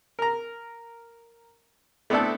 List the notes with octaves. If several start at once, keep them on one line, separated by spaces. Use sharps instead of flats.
A#4 A#5
A3 B3 C4 D4 E4 A4